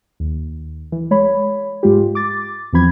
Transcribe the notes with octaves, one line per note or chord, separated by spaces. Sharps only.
D#2
E3
G#3 C#5 B5
G#2 G#3 F4 G4
D6 A6
E2 E3 F3 C4 B5 G#6